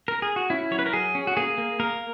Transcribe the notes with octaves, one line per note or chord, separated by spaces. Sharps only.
A#4
G#4
F#4
C#4 E4
F#3 C#5
B4
A#4
F#3 G#4
C#4
F#4
A#3 G#4
A#3
A#3 A#4